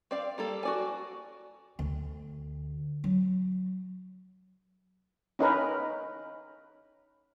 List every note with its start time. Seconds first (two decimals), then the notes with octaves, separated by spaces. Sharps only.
0.11 C4 D5 F5
0.38 G3 A#3 A4
0.63 F#4 D5 G#5
1.79 D2
3.04 F#3
5.39 C#4 D#4 A#4 B4